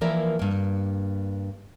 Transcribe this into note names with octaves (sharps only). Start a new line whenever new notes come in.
E3 F3 A#3 A#4 D5 E5
G2 A#3